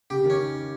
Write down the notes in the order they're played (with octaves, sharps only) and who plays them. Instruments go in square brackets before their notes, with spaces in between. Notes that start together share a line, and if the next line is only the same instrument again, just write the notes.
[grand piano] C#3 [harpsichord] G4
[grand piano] D#3
[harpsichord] C#4